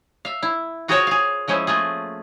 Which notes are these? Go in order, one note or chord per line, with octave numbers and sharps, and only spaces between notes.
E5 F5
E4
F4 F#4 G#4 A#4 C5 C#5
G#4 F5
F3 G#3 C#4 E4 C5
A3 A#3 F4 G#4